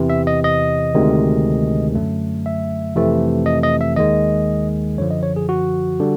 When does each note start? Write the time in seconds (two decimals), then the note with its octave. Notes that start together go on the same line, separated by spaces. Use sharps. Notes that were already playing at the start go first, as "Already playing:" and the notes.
Already playing: E2 C3 E3
0.10 E5
0.27 D#5
0.44 D#5
0.94 D2 C3 D#3 G#3
1.95 F#2 D3 F#3 A3
2.46 E5
2.96 F2 C3 E3 A3
3.46 D#5
3.63 D#5
3.81 E5
3.96 D#2 D#3 G#3 D#5
4.98 F#2 D3 F3 C#5
5.11 D#5
5.23 C#5
5.36 G#4
5.49 F#4
6.00 D3 G3